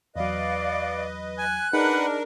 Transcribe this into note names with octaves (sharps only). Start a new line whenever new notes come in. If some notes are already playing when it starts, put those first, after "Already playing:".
E2 F#3 B4 D5 D#5 F5
G#5 F#6
D4 D#4 G#4 A#4 B4 F#5